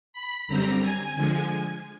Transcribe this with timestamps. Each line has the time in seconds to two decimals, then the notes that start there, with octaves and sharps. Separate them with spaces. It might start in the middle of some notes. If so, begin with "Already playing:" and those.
0.13 B5
0.48 F#2 D3 G3 C4 A#5
0.82 G#5
1.16 D3 F3 G#3